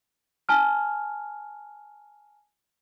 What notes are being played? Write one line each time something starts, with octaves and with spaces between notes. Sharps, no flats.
G#5 A5 F6